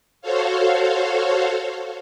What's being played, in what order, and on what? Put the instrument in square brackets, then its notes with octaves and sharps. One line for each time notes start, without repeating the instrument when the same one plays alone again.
[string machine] F#4 A4 C5 C#5 F5